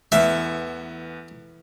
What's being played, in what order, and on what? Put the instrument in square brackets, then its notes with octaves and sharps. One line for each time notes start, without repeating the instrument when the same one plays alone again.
[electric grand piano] E2 B3 [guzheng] E3 A3 F5 [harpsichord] E5